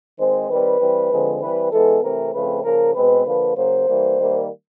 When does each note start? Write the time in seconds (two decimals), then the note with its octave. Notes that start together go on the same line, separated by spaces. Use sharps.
0.19 D#3 G#3 C4 C5
0.50 D#3 G3 C4 B4
0.80 E3 G3 C4
1.11 D3 F3 G#3 C4
1.42 E3 G3 C4 B4
1.72 E3 G#3 B3 A4
2.03 C3 E3 A3 C4 A#4
2.33 C#3 F3 A3 C4 B4
2.64 C#3 F3 A#3 A#4
2.95 B2 G#3 C4 B4
3.26 D3 F3 A#3 B4
3.56 C#3 F#3 A#3 C5
3.88 E3 G3 A#3
4.18 D#3 G3 A#3